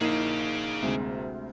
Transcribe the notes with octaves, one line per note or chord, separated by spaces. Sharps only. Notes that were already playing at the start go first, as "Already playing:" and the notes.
A#1 A#3 D#4 G#4 F5
D2 C3 G#3